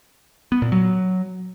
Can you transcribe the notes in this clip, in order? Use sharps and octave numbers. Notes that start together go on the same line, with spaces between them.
B3
A#2
F#3